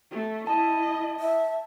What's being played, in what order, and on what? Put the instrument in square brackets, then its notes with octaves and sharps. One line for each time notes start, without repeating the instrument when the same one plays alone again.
[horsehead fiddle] A3
[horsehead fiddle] E4 D#5 [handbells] A5
[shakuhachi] E5